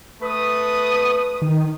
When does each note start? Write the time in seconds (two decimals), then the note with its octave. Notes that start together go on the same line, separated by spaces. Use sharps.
0.23 A3 B4 D#6
1.42 D#3